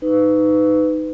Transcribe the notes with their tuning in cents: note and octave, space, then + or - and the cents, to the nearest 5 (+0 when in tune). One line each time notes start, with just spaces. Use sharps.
D#4 +0 B4 +25